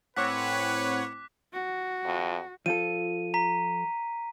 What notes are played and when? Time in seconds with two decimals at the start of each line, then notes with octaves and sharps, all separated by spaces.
0.17 A2 C4 B4 C#5 F#5 D6 F#6 B6
1.53 F#4
2.05 F2
2.66 F3 F4 A4 D#7
3.34 A#5 B6